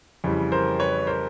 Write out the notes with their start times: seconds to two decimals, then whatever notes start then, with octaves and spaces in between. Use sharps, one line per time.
0.24 F2 C#3 E3 G3
0.52 A#4 C5
0.80 B4 C#5
1.07 A#4 C5